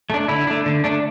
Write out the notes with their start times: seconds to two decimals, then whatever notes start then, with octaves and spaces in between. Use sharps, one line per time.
0.10 A3 D4
0.28 D3 E4
0.47 A3 D4
0.66 D3
0.84 A3 D4